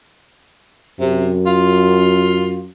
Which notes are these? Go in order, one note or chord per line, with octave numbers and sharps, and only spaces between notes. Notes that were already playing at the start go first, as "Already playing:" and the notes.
F#2 C3
F4